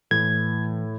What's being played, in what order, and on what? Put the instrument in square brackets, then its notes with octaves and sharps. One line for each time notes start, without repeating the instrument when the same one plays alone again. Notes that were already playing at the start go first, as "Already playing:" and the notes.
[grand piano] A2 [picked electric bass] E3 [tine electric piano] G#6